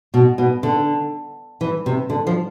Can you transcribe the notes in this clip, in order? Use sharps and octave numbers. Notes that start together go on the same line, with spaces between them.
B2
B2
D3
E3
C3
D3
F3